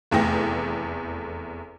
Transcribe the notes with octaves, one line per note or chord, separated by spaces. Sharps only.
F1 E2 A3 G5 A#6